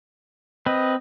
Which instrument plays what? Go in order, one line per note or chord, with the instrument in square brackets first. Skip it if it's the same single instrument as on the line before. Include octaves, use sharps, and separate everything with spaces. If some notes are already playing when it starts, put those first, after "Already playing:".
[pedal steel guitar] C4 B4 [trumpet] D#5